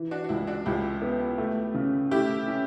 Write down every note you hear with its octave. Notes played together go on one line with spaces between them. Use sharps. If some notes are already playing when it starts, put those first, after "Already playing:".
Already playing: E3
D4 F#4
F#4
C#2 E4
D4 F#4
C#2 E4 G4
B3
A3
C#3
A3 E4 G4
C#4